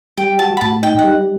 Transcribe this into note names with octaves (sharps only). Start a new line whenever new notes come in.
G3 G5
F#4 A5
B5
A2 A5
D#4 G5
F#5
G3